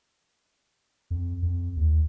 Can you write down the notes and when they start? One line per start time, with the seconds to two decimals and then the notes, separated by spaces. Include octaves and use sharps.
1.10 F2
1.42 F2
1.77 D#2